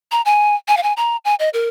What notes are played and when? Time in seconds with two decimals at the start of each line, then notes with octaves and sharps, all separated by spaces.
0.11 A#5
0.25 G#5
0.68 G#5
0.77 F5
0.83 G#5
0.97 A#5
1.25 G#5
1.39 D#5
1.53 A#4